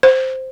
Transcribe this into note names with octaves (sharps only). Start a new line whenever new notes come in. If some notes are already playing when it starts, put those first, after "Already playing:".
C5